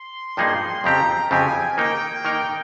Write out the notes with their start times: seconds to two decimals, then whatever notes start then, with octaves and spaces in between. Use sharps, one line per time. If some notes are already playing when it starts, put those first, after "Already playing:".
Already playing: C6
0.37 G2 F3 A#3 D#4 G#4
0.84 F2 C#3 F3 C4 G4 A#5
1.31 F2 C#3 F3 C4 G4 G#5
1.77 D#3 A#3 D#4 A#4 G5
2.25 D#3 A#3 D#4 A#4